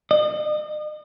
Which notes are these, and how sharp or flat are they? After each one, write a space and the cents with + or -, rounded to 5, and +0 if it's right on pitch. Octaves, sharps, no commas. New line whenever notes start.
D#5 -40